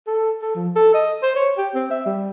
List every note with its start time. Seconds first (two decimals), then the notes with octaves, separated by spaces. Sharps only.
0.07 A4
0.42 A4
0.55 F3
0.76 A4
0.94 D#5
1.23 C5
1.36 C#5
1.58 G4
1.75 C4
1.91 E5
2.06 G3